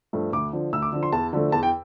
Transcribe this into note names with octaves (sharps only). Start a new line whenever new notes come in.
G2 F3 A3
D2 D6
D3 F3
D2 E6
D6
D3 F3
C6
E2 A5
D3 F3 A3
E2 A5
G5